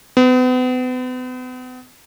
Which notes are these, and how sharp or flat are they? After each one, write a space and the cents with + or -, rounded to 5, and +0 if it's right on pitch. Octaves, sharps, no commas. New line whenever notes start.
B3 +40